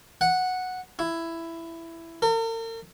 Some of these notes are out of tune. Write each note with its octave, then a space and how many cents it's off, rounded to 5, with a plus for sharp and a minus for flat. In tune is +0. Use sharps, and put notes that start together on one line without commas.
F#5 -5
E4 +10
A#4 -45